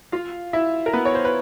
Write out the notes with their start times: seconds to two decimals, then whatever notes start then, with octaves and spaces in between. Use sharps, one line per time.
0.12 F4 F5
0.53 E4 E5
0.86 A#4
0.93 B3 B4
1.05 C#5
1.15 C5
1.25 B4